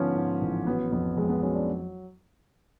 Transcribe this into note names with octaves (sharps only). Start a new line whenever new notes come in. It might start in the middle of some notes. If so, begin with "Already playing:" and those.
Already playing: G#2 D3 F3 B3 C#4
G#2
A1
F#3 B3
F2 B3
F2 G#3
B3
F#3 C#4
D4